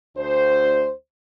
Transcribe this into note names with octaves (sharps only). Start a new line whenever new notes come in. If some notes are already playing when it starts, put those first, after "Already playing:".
D2 C5